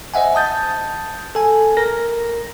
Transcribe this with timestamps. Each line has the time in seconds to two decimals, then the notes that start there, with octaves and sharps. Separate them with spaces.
0.14 C5 D#5 E5 F#5 G#5
0.35 A5 D#6 G6 A6
1.35 A4 G#5
1.77 A#4 A#6